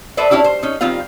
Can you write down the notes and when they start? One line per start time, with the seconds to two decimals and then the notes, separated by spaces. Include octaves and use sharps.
0.17 A4 B4 C5 D5 E5
0.30 C#4 D4 E4 G4 D5
0.44 C5
0.63 C#4 D#4
0.81 D#3 G3 C4 F4 F5